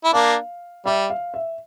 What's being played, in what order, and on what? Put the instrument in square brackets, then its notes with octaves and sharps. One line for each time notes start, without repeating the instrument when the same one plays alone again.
[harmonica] E4
[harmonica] A#3 D4 [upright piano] F5
[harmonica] G3 [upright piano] E5
[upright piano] F5
E5